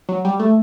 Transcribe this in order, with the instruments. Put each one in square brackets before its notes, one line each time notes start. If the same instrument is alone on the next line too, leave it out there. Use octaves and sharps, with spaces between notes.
[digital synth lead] F#3
G3
A3